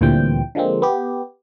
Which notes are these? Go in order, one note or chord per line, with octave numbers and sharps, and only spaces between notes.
D2 A#2 E3 G3 C4 G5
D3 F3 G#3 A#3 C4
B3 G4